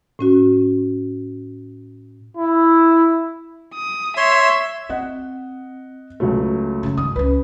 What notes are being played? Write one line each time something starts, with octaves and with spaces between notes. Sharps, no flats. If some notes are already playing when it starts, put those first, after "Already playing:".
A2 C#4 F#4
E4
D#6
C#5 E5 C6
C4 D#5 F#5
C#2 F#3 A3
F#2 C#3
G2 D#3 D#6
C#2 C#4 B4